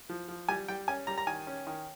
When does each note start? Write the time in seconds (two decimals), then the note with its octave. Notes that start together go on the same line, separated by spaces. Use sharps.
0.09 F3
0.28 F3
0.49 G3 G#5
0.68 G3 G5
0.88 C#4 G#5
1.07 G3 A#5
1.18 A#5
1.27 D#3 G#5
1.47 C#4
1.67 D#3